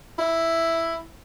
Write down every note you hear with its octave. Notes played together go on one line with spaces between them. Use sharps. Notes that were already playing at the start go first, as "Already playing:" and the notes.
E4